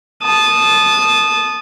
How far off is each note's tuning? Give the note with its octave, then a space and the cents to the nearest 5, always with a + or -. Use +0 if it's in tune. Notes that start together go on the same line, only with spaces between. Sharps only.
A5 -20 D#6 -15